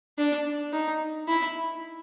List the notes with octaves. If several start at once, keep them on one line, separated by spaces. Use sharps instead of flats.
D4
D#4
E4